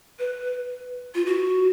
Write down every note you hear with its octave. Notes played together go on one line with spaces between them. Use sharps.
B4
F4
F#4